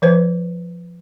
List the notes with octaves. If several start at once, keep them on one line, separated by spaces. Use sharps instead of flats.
F3 B4 C5